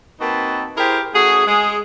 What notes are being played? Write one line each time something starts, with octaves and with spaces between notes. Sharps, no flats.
A#3 C4 D#4 F#4 B4 A5
E4 G4 G#4 A#4 C5
A3 C#4 F#4 G#4
G#3 G#4